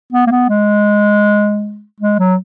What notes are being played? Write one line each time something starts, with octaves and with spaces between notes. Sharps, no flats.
B3
A#3
B3
G#3
G#3
F#3